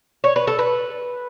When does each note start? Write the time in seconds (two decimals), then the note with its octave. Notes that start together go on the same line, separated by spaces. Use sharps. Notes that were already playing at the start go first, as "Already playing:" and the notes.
0.24 C#5
0.36 B4
0.47 A4
0.59 B4